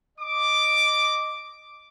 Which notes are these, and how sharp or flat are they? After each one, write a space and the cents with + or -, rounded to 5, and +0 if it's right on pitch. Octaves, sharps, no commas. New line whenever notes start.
D#5 +0 D6 +0